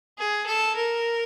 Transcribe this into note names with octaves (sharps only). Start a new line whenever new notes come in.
G#4
A4
A#4